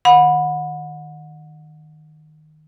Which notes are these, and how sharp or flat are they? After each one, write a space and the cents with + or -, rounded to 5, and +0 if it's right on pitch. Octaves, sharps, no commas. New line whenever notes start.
D#3 -15 F#5 -30 B5 +0